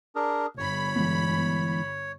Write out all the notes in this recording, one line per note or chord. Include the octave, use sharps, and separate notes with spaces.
D4 G#4 A#4
G1 C#5 B5
E3 G#3 B3